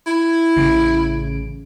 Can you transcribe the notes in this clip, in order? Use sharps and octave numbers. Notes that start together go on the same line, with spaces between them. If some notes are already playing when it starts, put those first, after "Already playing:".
E4
A1 C#3 D7